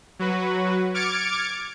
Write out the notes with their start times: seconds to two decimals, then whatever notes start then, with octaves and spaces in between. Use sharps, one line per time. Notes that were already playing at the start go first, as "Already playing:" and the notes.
0.19 F#3 F#4 B4
0.94 D6 F6 G#6 A6 C#7 D7